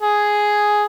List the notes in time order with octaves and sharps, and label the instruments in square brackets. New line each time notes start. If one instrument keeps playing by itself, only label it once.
[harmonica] G#4